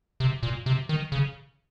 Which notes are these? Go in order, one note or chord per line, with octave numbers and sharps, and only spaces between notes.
C3
A#2
C3
D#3
C#3